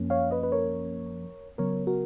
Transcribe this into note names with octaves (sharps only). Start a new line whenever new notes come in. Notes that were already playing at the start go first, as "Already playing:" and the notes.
Already playing: F#2 F3 A#3 C#4
C#5 F5
B4 D#5
B4
A#4 C#5
C#3 F#3 B3 A#4 C#5
F#4 A#4